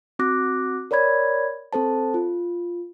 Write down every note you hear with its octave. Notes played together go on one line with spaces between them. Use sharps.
C4 F#4 D6 F#6 A#6
A#4 C#5 D5 B5 G#6
C4 A4 C5 A5
F4